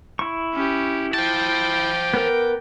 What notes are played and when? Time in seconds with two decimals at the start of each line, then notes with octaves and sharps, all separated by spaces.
0.19 E4 C#6
0.54 C#4 G4
1.14 C5 G5 A5 D6
2.14 B3 A#4